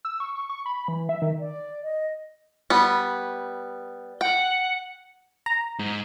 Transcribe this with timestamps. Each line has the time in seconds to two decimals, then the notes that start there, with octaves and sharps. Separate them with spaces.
0.05 E6
0.20 C#6
0.35 C#6
0.49 C#6
0.66 B5
0.88 E3
1.09 E5
1.22 D#3
1.39 D5
1.83 D#5
2.70 G3 B3
4.21 F#5 G5
5.46 A#5
5.79 G#2